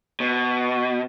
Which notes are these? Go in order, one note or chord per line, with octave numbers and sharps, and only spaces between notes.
B2